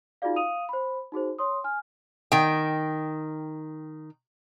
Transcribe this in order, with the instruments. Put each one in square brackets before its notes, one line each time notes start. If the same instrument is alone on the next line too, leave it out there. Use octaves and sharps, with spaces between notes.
[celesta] D#4 F4 F#4 G#4 D5 F5
F5 D#6 D#7 F7
C5 B5
D#4 F#4 G#4 C5
C#5 C6 D#6
G#5 F6
[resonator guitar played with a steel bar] D#3 G5